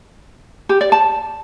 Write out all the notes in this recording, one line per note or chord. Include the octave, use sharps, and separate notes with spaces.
G4
D5
A5